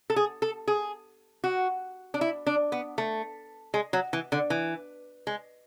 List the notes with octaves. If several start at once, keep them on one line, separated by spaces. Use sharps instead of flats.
A4
G#4
A4
G#4
F#4
D4
E4
D4
B3
A3
G#3
F#3
E3
D3
E3
G#3